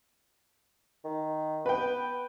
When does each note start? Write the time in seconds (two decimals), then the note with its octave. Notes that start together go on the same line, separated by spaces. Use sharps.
1.04 D#3
1.66 B3 B4 G5